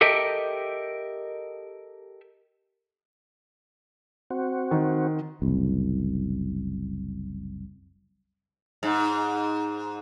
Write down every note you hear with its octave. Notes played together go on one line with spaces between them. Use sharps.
G4 A4 A#4 D#5 E5 G5
C4 F#4
D#3
F#1 C2
G#2